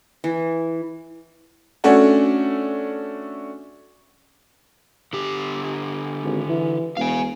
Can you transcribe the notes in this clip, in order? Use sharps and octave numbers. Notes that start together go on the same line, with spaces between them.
E3
A3 C#4 D4 F#4
D3 G4
G#1
E3
E1 F5 G#5